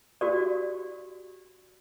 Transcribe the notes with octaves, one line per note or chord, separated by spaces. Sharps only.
F#4 G4 D5